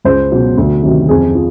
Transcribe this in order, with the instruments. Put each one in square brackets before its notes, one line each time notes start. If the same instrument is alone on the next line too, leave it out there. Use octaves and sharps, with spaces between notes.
[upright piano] C#2 C5
B2 F#3 F#4
D2
C3 D#3 F#3
F2 G#4
F3